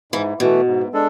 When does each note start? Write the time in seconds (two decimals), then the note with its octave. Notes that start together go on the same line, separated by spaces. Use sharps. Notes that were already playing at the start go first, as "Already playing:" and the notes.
0.12 G#2 E3
0.40 B2 E3 A3
0.67 G#2
0.93 G#3 D4 A4